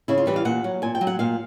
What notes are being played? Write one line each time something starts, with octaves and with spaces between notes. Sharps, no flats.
C#3 E4
F4
E3 G3 B4
F5
A#2 F#5
F#3
A#2 G#5
G5
F#3
F#5
A#2 F5